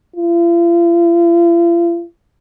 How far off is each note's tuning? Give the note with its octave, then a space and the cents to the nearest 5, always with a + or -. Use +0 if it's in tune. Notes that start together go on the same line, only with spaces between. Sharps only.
F4 -45